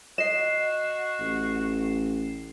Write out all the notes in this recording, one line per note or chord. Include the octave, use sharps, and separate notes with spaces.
F#4 D#5 C7 E7
A1